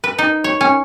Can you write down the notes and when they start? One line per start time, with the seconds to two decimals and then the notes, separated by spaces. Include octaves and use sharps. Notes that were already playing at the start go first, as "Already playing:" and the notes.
0.04 B4
0.18 D#4
0.44 C#5
0.61 C#4